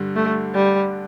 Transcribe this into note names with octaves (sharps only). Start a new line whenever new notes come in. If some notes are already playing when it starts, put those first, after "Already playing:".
Already playing: G2 D3
A3
G3